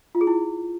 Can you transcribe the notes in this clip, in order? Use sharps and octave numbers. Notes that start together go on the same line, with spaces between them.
F4
G#4
E4